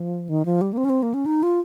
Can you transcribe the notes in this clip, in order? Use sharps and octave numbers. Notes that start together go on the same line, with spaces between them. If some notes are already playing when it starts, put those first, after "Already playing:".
Already playing: F3
D#3
F3
G3
A#3
C4
C#4
C4
A#3
C#4
D#4
F4